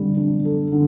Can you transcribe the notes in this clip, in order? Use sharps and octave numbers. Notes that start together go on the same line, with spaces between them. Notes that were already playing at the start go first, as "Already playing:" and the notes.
Already playing: D3 G3
D4
A4
D3